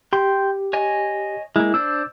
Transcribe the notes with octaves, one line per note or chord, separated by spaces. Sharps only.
G4 G5 C6
C#5 D#5 G#5
G#3 A#3 E4
D4 C5 D5 E6